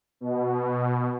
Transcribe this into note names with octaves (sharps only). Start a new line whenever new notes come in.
B2